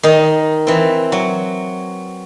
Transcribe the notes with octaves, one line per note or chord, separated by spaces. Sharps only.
D#3 D#4 D#5
E3 C4
F#3